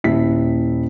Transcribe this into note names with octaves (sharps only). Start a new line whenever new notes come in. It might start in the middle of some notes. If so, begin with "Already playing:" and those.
D#1 E4 B6